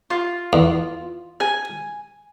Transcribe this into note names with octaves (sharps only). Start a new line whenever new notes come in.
F4
E2
G#5